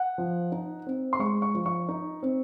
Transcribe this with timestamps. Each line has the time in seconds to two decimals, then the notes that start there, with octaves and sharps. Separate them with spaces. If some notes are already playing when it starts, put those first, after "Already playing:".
Already playing: F#5
0.18 F3
0.52 D#4
0.86 C4
1.13 C6
1.19 G#3 C#6
1.42 C#6
1.54 F3
1.66 C#6
1.89 D#4
2.23 C4